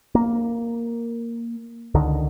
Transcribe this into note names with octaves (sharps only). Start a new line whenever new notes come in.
A#3
C#2 D3 D#3